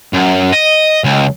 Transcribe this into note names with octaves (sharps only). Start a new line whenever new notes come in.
F#2
D#5
C#2